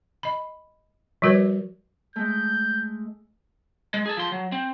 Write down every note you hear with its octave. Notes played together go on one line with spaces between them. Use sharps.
D#5 B5
F3 G3 F#4 A#4 B4 C#5
G#3 A3 G6
G#3
G#4 A4
F3 C6
F#3
C4